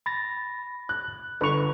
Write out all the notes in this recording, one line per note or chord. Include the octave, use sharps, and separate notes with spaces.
B5 A6 A#6
F#6
G1 B4 C#6 F7